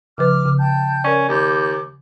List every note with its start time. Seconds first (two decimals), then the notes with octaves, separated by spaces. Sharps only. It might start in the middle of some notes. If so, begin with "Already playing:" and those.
0.18 C#3 F3 B4 D6 F6
0.45 C#3
0.60 G5 A5 G6
1.04 C#4 A#4 D5
1.28 D#2 D6 G6